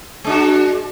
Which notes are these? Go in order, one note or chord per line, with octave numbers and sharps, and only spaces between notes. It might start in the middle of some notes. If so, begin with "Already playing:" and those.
G#3 D4 F#4